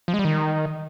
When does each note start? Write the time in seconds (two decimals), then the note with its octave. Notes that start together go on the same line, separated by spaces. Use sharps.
0.08 F3
0.14 G#3
0.19 G3
0.25 D#3